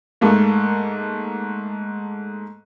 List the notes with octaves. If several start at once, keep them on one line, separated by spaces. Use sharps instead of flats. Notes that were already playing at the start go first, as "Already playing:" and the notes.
G#2 A3 A#3